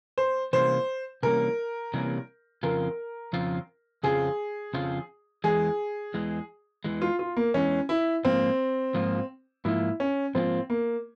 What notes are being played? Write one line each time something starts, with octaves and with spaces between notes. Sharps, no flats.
C5
C3 E3 G3 A#3 C#4 C5
C3 E3 G3 A#3 C#4 A#4
C3 E3 G3 A#3 C#4
F2 C#3 F3 C4 F4 A#4
F2 C#3 F3 C4 F4
F2 C#3 F3 C4 F4 G#4
F2 C#3 F3 C4 F4
E2 E3 G#3 G#4
E2 E3 G#3
E2 E3 G#3
F4
F4
A#3
E2 E3 G#3 C#4
E4
G#2 F3 A#3 C4 F4
G#2 F3 A#3 F4
G#2 F3 A#3 E4 F4
C#4
G#2 F3 A#3 C4 F4
A#3